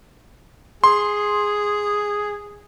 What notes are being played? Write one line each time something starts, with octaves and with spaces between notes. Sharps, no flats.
G#4 C6